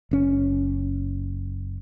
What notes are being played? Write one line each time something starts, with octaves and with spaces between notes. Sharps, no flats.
F#1 C#4